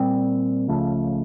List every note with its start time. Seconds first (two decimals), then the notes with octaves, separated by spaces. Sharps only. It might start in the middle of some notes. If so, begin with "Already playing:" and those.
Already playing: A#2 G3 C4
0.68 C#2 C#3 F3 A3